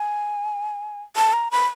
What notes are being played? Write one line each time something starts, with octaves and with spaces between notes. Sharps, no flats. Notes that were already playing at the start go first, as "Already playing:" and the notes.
Already playing: G#5
A5
A#5
B5